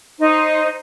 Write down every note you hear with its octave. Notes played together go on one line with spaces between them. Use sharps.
D#4 C5